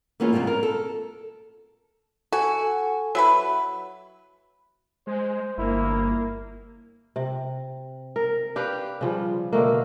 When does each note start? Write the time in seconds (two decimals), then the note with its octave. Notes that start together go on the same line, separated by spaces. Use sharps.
0.20 E3 G#3 A#3 B3 C#4 F4
0.33 G#2 C3 E3 F3 G3
0.47 A#4
0.63 A4
2.32 F#4 A4 G#5
3.15 F#3 E4 B4
5.07 G#3 C5
5.58 G1 A#3 E4
7.16 C3
8.16 A#4
8.56 D4 G4 B4 F5
9.01 C#3 F3 G3
9.53 B2 D3 A3 A#3